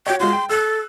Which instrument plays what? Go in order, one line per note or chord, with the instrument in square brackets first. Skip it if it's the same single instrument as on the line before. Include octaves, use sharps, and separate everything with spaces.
[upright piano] F#4 C#5 [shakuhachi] G5
[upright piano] G#3 F4 F#4 [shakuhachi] C6
[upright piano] G5
[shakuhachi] A4 [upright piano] E6 F#6